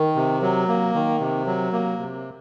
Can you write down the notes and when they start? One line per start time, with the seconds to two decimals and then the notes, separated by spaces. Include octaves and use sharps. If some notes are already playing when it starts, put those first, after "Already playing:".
Already playing: D#3
0.16 C3
0.42 F#3
0.68 A#3
0.94 D#3
1.20 C3
1.46 F#3
1.73 A#3
1.99 C3